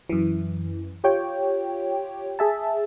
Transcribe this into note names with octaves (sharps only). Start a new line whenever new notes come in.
F#2 E3
F4 G4 C#5 G5
G#4 E5 A5